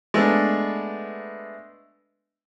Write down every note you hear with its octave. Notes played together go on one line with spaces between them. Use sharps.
G#3 A3 B3 D4